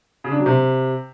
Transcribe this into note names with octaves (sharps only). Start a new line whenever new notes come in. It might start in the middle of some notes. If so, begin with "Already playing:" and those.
C#3
D4
F#3
C3